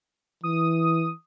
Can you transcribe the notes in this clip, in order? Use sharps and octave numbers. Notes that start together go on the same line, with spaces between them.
E3 D#6